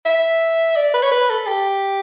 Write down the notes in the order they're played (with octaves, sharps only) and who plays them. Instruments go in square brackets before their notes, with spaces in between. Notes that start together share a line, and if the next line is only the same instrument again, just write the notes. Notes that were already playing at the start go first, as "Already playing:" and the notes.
[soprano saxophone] E5
D5
B4
C#5
B4
A4
G4